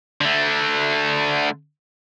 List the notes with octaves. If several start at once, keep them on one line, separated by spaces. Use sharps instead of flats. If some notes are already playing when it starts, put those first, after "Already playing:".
D3 A3